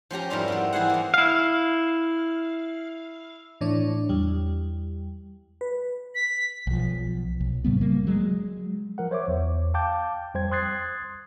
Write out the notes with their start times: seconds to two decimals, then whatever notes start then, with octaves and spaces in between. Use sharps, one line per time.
0.11 F3 C#4 G4 A#5
0.30 F2 G#2 G3 E4 F4 A#4
0.48 B3 C4 E4
0.73 E3 E4 G#4 C5 F#5
0.90 E3 A#3
1.14 E4 F5
3.61 A2 E3 D4 C#5
4.09 E2 G3
5.61 B4
6.15 B6
6.67 B1 F3
7.40 B1
7.64 A2 C#3 G3 B3
7.81 C#3 G3 A#3
8.07 F#3 G#3
8.98 F3 A#4 F#5
9.11 C5 C#5 E5 D6
9.28 E2
9.74 F5 G5 A5 D6 G6
10.34 F2 G3 C5 G5 G#6
10.51 C6 D#6 F#6 G#6 A6 C7